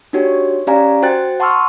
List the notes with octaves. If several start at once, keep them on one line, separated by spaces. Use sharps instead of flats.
D4 D#4 F#4 G4 C#5
C#4 G4 D5 F5 G#5 A#5
F#4 C5 G5 F#6 A6
F#5 A5 C6 C#6 E6 F6